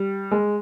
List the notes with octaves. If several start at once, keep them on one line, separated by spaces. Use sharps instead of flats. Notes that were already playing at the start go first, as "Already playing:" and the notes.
Already playing: G3
G#3